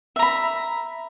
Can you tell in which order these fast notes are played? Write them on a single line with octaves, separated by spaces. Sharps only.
E5 A#5 B5